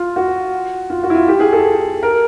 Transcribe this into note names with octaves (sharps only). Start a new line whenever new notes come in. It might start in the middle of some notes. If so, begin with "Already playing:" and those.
Already playing: F4
F#4
F4
F#4
E4
F4
G4
G#4
A4
A#4